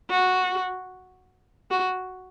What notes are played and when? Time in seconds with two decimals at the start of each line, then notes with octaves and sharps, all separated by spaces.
0.10 F#4
1.71 F#4